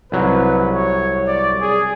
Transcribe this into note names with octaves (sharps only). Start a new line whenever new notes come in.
C2 F#3 B4
C#5
D5
G#4